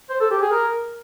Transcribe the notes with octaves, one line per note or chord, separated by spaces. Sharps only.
C5
A4
G4
G#4
A#4